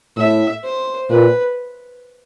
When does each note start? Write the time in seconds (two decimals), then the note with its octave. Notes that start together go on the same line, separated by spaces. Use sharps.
0.16 A2 E5
0.64 C5
1.09 A#2 B4